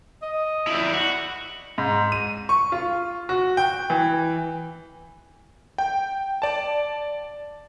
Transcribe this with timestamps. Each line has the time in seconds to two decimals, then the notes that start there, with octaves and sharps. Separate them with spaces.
0.22 D#5
0.67 E4 D5
0.94 F#4
1.78 G#2
2.12 D#7
2.49 C#6
2.72 F4
3.29 F#4
3.57 G5
3.90 E3
5.78 G5
6.42 D5 A5